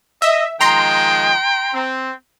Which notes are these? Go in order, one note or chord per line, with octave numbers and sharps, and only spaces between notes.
D#5 E5
D#3 F3 G#3 G5 A#5 C6
C4